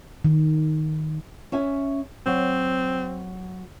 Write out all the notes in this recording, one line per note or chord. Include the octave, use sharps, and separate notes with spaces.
D#3
C#4 E5 G#5
F#3 C4